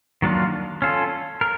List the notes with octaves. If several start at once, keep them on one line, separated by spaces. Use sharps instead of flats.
D#3 F#3 A#3 D4 F4
C#4 F4 A4
A#4